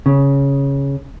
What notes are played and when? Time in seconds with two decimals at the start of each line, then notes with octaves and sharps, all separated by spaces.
0.06 C#3